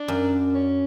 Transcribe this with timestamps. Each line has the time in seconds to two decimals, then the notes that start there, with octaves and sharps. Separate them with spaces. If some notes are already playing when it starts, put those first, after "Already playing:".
Already playing: D4
0.08 F#2
0.55 C#4